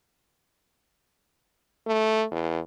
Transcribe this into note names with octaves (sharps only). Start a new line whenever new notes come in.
A3
E2